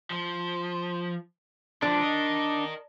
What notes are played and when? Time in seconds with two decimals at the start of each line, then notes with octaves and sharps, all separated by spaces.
0.10 F3
1.82 D3 F3 D4
2.01 A#4 D#5